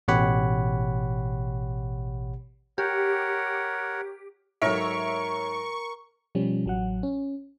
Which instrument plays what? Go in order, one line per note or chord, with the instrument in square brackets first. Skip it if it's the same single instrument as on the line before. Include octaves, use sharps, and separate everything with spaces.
[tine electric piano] A1 B2 G4 C#5 F#5 B5
[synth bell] G4 [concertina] A#4 C#5 F#5
[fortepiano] G#2 F#3 [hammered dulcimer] A#4 [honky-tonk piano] C#5 E5 [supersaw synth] C#6
[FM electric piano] B2 F3 G3 C#4
A1 F#3 F#5
C#4